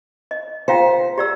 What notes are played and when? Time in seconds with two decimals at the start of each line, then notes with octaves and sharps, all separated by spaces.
0.31 D#5
0.68 F4 C5 F5 G5
1.18 G4 D5 E6